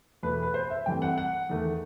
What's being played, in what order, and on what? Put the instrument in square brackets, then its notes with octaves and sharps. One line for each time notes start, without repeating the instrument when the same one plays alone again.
[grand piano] E2 B2 A3 B4
B4
C5
E5
G2 E3 A3 C4 G5
F#5
F#5
E2 D#3 A3